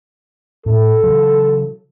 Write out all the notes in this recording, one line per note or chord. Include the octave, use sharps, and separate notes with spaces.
A2 A4
C#3 E3 F#3